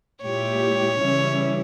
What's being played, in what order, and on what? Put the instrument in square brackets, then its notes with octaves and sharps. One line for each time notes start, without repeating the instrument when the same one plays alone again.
[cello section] A#2 G#3 E4 G4 [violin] C#5
[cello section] C#3 E3 G3 C#4 E4